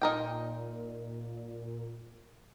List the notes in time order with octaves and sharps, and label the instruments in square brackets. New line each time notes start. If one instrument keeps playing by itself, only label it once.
[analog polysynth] A#2 [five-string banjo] D#4 A#4 G5